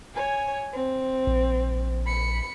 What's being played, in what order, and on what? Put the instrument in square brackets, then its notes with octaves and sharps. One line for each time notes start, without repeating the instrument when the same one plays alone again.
[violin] C#5 G#5
C4
[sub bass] A#1
[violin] B5 C#7